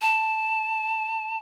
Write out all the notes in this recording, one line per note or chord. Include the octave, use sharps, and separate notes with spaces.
A5